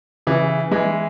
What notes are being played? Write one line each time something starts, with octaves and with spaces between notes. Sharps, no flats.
C#3 E3
E3 G#3